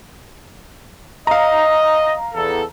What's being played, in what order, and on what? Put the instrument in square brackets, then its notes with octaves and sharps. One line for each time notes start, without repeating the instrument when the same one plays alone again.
[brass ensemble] D#5 [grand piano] F5 A#5
[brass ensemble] E2 A4